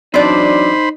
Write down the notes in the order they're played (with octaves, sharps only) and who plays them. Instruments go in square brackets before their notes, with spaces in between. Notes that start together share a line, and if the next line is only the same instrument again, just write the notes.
[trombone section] E3 F#3 D4 [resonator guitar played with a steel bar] C4 D5 [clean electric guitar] D#4 [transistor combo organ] C5 B5